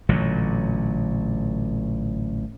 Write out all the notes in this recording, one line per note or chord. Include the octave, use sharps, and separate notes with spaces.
A1 A#2 D3 F#3